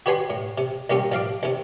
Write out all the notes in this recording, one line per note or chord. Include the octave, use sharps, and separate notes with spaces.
F#4 G4 B4 C#5 G#5 C6
A2
C3
C2 A#3 C#4 G4 C#6
A1 F3 F5 D6
D#2 C3